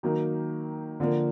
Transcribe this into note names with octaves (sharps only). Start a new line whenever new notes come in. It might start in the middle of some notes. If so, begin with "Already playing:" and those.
D#3 F#3 A#3 D#4
D3 F3 A#3